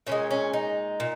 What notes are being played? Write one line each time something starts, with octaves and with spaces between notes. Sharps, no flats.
A#2 F3 G#3 C#4
C#4
D#4
A#2